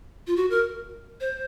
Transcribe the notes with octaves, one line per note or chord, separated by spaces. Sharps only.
F4
F#4
A#4
C5